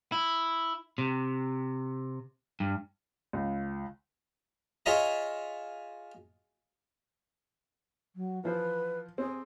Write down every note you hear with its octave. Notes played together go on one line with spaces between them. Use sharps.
E4
C3
G2
C#2
F4 G#4 C#5 D#5 E5 A#5
F#3
E3 F3 B4 C5
C4 G#4